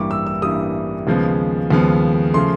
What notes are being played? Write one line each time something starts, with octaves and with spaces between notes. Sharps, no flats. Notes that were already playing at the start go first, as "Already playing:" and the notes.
Already playing: A1 G2 E3 G3 A#3 C#6 D6
E6
E6
A1 G2 E3 G3 A#3 D#6
D#2 C#3 F3 G#3 B3
D#2 C#3 F3 G#3 B3
C#3 F3 A3 C6